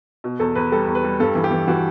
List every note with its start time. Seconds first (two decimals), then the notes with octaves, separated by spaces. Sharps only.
0.24 B2
0.39 E2 A4
0.55 E2 B4
0.72 G3 A4
0.87 E2
0.95 B4
1.04 G3
1.20 G2 A4
1.35 E3
1.44 G4
1.51 E3
1.68 E3 F#4